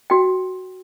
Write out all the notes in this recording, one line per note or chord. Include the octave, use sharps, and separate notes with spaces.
F#4 G5